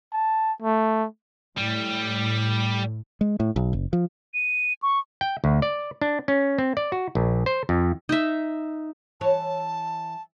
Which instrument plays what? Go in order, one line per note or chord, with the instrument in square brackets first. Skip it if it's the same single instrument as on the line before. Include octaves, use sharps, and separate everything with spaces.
[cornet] A5
A3
[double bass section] A2 [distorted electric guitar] G3
[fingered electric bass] G#3
A2
B1
F#1
F3
[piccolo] D#7
C#6
[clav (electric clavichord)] G5
D2
D5
D4
C#4
C4
D5
F#4
A#1
C5
F2
[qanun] D#4 E5
[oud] E3 C#5 [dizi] A5